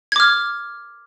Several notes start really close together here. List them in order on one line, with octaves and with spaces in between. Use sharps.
G#6 D6 F6